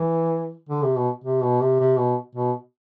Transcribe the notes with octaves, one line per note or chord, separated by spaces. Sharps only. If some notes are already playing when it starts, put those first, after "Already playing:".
Already playing: E3
D3
C3
B2
C3
B2
C3
C3
B2
B2